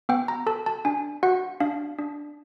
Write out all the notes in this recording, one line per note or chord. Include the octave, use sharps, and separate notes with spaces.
B3 G5
A#5
A4 A5
A5
D4 G#5
F#4 F#5
D4 F5
D4